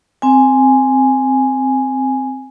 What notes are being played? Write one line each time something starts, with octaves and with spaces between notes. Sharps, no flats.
C4 G#5